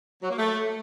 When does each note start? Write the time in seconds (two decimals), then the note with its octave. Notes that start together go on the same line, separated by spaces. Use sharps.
0.22 F#3
0.29 A#3
0.37 A3